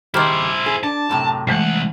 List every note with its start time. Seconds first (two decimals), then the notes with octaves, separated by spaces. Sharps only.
0.14 D#3 E4 G4 G#4 C5 C6 F6
0.66 G#4
0.83 D4 A5
1.09 F#2 A2 C3
1.47 C2 E3 G#3 A3 F#5